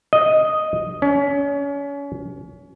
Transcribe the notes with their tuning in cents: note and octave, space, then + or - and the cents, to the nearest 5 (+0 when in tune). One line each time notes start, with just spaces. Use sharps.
D#5 +0
C#4 +30